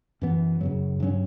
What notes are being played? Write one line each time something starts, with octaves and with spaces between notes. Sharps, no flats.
F#2 E3 B3
F#2 C#3 F#3
G2 F#3 C#4